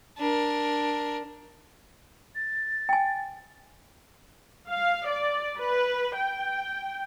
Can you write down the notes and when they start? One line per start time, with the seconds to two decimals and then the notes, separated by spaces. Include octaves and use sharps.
0.18 D4 A#4
2.35 A6
2.89 G5 G#5
4.70 F5
5.09 D5
5.58 B4
6.17 G5